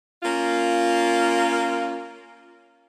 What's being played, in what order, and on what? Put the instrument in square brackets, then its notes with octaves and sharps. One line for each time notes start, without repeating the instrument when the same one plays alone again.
[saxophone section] A#3 C#4 F4